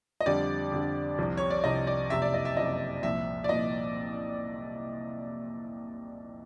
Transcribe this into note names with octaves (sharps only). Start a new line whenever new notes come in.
D#5
F2 D3 G3 D5
F2 D3 G3
C2 C3 F3
C#5
D5
C2 C3 F3 D#5
D5
F#1 F2 C3 E5
D5
D#5
E5
F#1 F2 C3 D#5
C2 A#2 F3 E5
D5
C2 A#2 F3 D#5